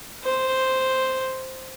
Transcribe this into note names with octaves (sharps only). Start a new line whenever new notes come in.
C5